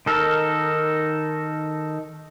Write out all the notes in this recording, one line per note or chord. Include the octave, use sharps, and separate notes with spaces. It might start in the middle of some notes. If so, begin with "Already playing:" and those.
D#3 D#4 A4 A#4